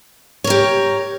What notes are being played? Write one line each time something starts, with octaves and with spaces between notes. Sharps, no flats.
G4 A#4 C#5